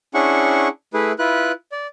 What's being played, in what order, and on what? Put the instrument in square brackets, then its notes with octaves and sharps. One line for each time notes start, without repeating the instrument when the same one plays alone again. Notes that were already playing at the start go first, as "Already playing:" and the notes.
[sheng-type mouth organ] C#4 D4 E4 G#4 F#5 C#6
A3 E4 G#4 B4
E4 F4 B4 F#6
D5